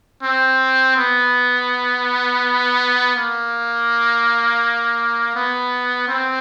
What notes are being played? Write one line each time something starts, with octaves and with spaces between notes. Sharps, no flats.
C4
B3
A#3
B3
C4